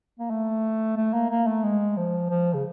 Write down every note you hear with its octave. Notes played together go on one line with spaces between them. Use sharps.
A#3
A3
A3
A#3
A#3
A3
G#3
F3
F3
C#3